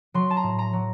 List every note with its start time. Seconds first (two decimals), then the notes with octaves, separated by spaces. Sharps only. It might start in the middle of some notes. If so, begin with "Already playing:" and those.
0.14 F#3 C6
0.30 A5
0.37 A#5
0.43 A2
0.59 A#5
0.73 F#3